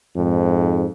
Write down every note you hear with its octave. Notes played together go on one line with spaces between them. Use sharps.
F2 G#2